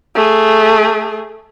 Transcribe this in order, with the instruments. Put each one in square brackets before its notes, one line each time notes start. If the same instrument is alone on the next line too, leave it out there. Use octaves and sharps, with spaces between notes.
[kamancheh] A3 G#4